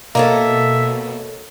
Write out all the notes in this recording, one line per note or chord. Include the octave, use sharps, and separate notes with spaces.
B2 A#3 A4 C#5 D#5 E5